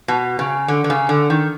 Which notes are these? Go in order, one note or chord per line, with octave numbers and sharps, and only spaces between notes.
B2
C#3
D3
D3
C#3
D3
D#3